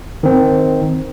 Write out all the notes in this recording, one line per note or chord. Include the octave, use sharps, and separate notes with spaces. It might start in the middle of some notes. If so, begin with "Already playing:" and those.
D#3 C4